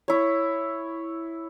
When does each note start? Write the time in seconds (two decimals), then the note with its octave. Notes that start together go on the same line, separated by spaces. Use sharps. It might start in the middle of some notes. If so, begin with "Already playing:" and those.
0.08 E4 C#5